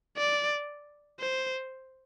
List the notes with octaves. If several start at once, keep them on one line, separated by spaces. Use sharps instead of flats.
D5
C5